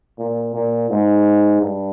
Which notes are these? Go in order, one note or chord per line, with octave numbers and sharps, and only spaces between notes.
A#2
A#2
G#2
G2